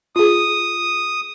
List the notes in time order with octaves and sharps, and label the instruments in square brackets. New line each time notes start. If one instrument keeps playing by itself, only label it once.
[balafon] F4 G#4 [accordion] D#6